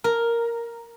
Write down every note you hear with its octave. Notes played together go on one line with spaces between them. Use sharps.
A#4